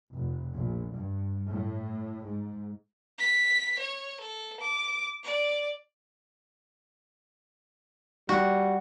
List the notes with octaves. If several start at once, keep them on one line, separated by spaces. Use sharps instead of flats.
F1
A#1
G2
A2
G#2
B6
C#5
A4
D6
D5
G3 F#4